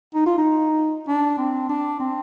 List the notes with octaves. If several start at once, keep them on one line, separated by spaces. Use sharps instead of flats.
D#4
F4
D#4
D4
C4
D4
C4